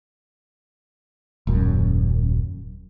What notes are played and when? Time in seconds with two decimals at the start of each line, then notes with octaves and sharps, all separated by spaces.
1.47 D#1 F#2